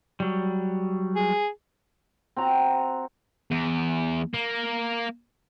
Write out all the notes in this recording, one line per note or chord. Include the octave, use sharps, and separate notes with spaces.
F#3 G3
G#4
C4 F#4 A#5
E2
A#3